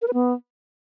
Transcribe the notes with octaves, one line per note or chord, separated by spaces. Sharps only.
A#4
B4
B3